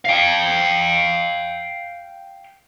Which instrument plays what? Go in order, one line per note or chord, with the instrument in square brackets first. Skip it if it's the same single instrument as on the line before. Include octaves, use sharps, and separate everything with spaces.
[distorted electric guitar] F5 G5